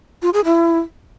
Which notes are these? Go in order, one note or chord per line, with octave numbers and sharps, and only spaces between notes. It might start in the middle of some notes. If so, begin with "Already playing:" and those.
F4
G#4
E4